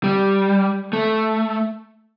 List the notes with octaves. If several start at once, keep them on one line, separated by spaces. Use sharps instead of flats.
G3
A3